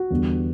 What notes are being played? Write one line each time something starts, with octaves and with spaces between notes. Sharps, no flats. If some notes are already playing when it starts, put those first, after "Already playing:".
Already playing: F#4
E2 D3 G3 B3